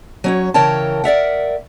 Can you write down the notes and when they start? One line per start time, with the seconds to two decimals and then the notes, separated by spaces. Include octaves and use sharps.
0.24 F#3 C#4 C#5
0.54 C#3 E3 A#4 C#5 G5 A5
1.04 A#4 D5 E5 F#5